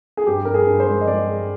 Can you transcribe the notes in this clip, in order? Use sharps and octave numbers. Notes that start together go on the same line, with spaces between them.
G#4
G2 G4
G2 A#4
G#4
G2
C5
G#3
D#5
G#3 D5
G#3